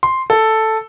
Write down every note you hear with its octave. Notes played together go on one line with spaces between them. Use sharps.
C6
A4